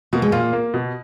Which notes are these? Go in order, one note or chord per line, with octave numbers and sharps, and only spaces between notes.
B2 A#3
G#3
A#2 A#3 F4
A#3
B2